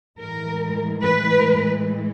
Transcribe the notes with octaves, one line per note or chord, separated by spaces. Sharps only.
A2 E3 G#3 A#4
B4